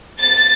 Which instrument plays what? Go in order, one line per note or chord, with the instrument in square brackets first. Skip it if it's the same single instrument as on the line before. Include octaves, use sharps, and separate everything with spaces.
[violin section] A6